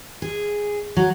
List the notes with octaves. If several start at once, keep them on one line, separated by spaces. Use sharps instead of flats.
G#4
F#3